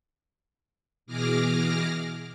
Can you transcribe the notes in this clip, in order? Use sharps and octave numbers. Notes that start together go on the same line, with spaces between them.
B2 E3 G#4 D6 F6 A#6